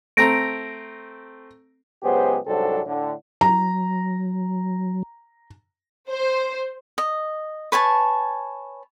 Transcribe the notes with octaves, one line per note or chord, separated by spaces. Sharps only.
A3 C4 A#5 A#6 D7
C#2 F#3 B3 G4 G#4 C5
C2 G#2 F#3 C4 D4 A4
A2 D3
F#3 A#5
C5
D#5
B4 C#5 G#5 A5